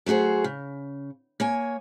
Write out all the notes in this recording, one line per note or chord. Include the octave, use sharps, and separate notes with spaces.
F#3 A3 F#4 G#4 C5
C#3
A#3 C#5 G#5